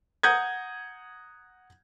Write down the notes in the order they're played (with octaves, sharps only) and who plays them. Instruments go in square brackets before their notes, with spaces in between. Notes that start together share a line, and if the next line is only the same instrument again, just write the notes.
[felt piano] F#5 A#5 D#6 G6 G#6